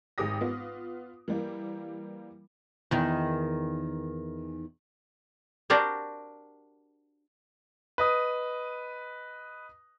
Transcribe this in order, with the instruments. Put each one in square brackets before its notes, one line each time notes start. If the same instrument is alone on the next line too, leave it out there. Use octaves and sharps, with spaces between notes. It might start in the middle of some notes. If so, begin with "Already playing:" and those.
[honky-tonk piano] G#1 G4 G#4 D6 D#6 A#6
B3 F4
E3 G3 A#3
[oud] E2 D#3
[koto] D4 F#4 G4 A#4 C5
[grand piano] B4 D#5 D#6